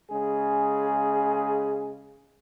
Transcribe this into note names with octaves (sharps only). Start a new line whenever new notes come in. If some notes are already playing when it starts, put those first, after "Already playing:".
C#3 G#3 G#4